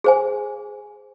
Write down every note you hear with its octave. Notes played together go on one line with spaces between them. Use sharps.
G#4 C5 G#5